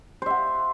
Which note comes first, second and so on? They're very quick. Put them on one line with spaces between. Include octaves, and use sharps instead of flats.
C5 E5 F#5